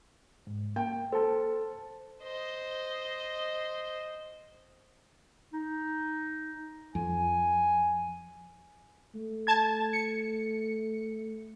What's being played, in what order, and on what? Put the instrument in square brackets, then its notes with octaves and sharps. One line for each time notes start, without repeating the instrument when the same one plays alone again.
[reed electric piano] G#2
[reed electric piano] A#3 [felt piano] G5
[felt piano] A4 [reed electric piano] C5 A5
[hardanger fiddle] C5 D#5
[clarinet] D#4
[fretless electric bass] F2 [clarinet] G#5
[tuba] A3
[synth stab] A5 G#6
C#7